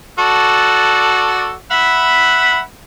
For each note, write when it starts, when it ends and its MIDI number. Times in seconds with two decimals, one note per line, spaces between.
0.19 1.53 66
0.19 1.53 69
0.19 1.53 74
1.71 2.60 76
1.71 2.60 78
1.71 2.60 83